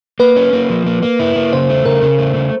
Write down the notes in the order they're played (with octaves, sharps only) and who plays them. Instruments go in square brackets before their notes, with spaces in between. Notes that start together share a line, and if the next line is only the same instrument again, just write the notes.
[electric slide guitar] A#3 [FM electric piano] B4
[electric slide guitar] C#4
A#3
F3
A#3
A#3
E4
A#3
[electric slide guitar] C#3 [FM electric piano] C5
[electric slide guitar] A3
[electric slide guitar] C#3 [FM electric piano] A#4
[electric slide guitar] C#3
A3
C#3